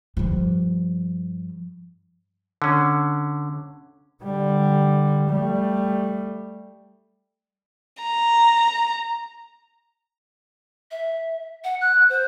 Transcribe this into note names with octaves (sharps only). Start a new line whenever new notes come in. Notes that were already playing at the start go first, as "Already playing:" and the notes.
G2 F3
D3 C#4
D3 G3
G3 A3
A#5
E5
F#5
F#6
C5